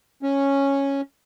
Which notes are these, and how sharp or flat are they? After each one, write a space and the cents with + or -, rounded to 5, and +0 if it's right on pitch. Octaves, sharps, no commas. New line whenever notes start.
C#4 -5